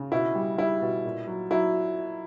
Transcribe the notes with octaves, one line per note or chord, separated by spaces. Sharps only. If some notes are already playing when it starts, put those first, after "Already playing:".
Already playing: C#3
B2 E4
G3
G3 E4
B2
A#2
F#3
F#3 E4